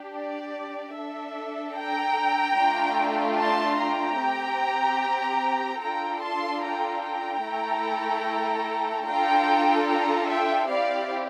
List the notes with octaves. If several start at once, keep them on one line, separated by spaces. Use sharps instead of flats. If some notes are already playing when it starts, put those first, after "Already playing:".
Already playing: D4 G4
D5
D4 A4 E5
G5 A#5
A3 D4 F4
A5 C6
G5 A#5
C4 G4
D4 F4 A4 G5 A#5
A5 C6
G5 A#5
G5 A#5
A3 E4 A4
D4 F4 A4 G5 A#5
G5 A#5
E5 G5
C4 E4 G4 D5 F5